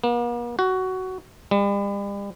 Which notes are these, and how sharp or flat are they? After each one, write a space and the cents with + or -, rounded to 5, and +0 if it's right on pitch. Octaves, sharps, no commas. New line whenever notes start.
A#3 +45
F#4 +15
G3 +40